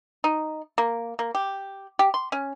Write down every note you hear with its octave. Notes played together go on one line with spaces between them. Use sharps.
D#4
A#3
A#3
G4
G4
C6
C#4